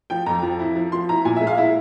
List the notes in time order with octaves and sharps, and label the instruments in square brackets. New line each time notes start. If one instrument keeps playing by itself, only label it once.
[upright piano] F3 G5
F2 A#5
F3
E4
F3
F3 C6
E4 A#5
A#2 G#5
E5
G#3
F5
E4 E5